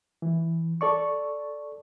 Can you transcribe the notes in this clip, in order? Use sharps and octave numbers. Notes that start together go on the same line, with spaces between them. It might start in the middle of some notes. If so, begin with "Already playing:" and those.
E3
A4 D5 C#6